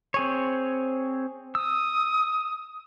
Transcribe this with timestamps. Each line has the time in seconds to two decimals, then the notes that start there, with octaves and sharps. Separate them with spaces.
0.14 C4 G#4 C#5
1.55 D#6 E6